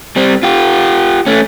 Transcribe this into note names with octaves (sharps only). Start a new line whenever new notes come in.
G3 C4
F4 G4
A3 C#4